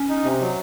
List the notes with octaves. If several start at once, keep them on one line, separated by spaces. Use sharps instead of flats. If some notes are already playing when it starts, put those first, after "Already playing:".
Already playing: C#4
D#4
C3
F#3